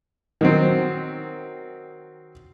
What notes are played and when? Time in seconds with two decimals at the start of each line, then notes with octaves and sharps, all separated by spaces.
0.41 D#3 F#3 C4